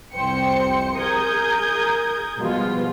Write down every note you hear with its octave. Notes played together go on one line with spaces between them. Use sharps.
C2 F2 C5 G5 C#7
G#4 A#4 D#6 G6 G#6
B2 F3 G3 G#3 F4